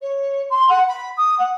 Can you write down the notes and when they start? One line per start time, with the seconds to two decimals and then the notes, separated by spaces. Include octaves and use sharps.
0.01 C#5
0.50 C6
0.68 F#5
0.88 B5
1.17 D#6
1.38 F#5